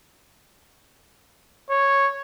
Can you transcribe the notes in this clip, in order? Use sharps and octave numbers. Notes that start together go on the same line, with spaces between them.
C#5